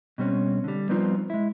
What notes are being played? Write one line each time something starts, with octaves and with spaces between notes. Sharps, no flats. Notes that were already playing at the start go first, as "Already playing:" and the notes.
B2 G3 C4 C#4
D3 G3
F3 G3 B3 C4 D#4 F4
G#3 E4